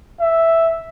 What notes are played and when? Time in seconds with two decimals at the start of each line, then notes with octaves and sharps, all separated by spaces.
0.20 E5